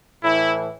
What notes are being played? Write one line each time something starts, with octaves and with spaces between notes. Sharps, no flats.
A2 E3 E4